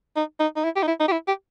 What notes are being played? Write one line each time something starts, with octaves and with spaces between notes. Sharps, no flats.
D#4
D#4
D#4
E4
G4
D#4
E4
D#4
G4
E4
G4